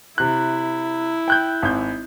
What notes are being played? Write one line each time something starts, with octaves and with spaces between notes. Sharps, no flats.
C3 E4 F#6
G5 F#6 G6
G#1 G6